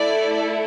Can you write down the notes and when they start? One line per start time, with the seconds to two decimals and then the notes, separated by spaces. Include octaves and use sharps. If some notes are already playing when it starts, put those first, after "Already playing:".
Already playing: A3 E4 A4 D5